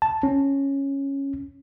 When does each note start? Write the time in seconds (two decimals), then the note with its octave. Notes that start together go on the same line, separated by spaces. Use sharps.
0.02 A5
0.23 C#4